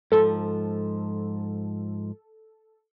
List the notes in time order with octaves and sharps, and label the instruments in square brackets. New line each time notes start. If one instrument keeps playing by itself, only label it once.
[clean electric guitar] G#2 F3 [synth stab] A4